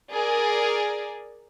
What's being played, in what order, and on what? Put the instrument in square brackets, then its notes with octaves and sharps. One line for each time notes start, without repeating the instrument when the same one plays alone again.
[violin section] G#4 A#4 D5